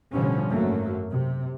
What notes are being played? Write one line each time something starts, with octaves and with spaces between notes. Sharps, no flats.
A1 B2 D3 F3 G3 C#4
G#1 F#2 F#3 A3 A#3
C3